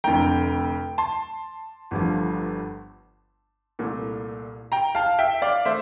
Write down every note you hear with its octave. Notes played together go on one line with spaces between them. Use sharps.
F1 F2 D3 A3 G5 A#5
A5 C6
G1 G2 D3 F3 A3
C2 A#2 A3
G5 A#5
F5 A5
E5 G5
D5 F5
A3 C5 E5